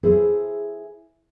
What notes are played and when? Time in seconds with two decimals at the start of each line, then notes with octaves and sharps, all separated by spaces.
0.03 E4 G#4 A4 C5